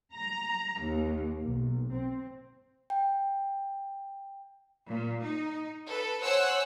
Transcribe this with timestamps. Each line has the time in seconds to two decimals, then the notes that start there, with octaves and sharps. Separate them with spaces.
0.14 A#5
0.82 D#2
1.44 B1
1.92 C4
2.90 G5
4.90 A#2
5.24 D#4
5.89 A4 B4
6.22 C5 C#5 F#5 G#5 E6 F#6